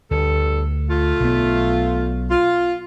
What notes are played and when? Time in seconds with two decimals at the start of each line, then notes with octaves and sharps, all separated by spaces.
0.11 D2 G2 A4
0.90 A3 F4
1.20 B1 B3
2.30 F4